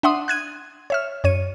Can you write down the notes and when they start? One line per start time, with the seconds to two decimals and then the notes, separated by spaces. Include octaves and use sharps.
0.03 D4 E5 F#5 C6 D#6
0.28 F#6 G#6 D#7
0.90 C#5 E5 F6
1.24 F#2 C#5 D#7